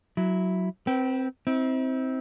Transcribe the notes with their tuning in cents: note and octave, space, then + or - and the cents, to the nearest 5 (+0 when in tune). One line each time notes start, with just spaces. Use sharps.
F#3 +0 E4 +0
C4 +0 B4 -25 G5 -30
C4 +0 E4 -45